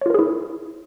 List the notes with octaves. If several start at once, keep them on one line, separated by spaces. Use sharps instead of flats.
E4 F4 G#4 A#4 C#5